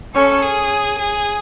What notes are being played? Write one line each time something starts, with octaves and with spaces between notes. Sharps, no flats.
C#4 A4
G#4
G#4